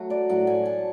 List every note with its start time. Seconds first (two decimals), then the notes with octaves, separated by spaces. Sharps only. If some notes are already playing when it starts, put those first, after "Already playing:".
Already playing: F#3 A3 F#4
0.10 D5
0.29 A2 F#3 A3 F#5
0.47 G#5
0.66 A5